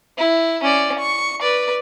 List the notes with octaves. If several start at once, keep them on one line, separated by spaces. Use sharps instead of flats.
E4
C#4 D5
C#6
B4 D5